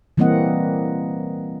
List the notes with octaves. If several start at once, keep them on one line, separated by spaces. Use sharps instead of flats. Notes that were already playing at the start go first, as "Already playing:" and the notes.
E3 G3 A#3 C4 D#5 F#5